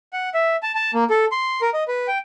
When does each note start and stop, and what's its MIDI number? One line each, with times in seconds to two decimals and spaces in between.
0.13 0.29 78
0.34 0.56 76
0.63 0.72 81
0.75 0.91 81
0.94 1.04 58
1.10 1.25 69
1.32 1.61 84
1.61 1.70 70
1.74 1.83 75
1.88 2.07 71
2.08 2.18 79